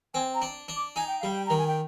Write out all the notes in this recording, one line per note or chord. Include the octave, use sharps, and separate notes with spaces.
C4 G#5
A#5
D4
D4
D6
D#4 G#5
G5
G3 F5
G5
D#3 A#5
G#5
G5